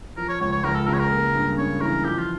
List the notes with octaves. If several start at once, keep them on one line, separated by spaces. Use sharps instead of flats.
F3 A#4
C#5
C#2 C#5
C#5
C#2 A#4
A4
C#3 A#4
C#5
A#4
A#3
G2
C#4 C#5
E3 A#4
F3 G4
F4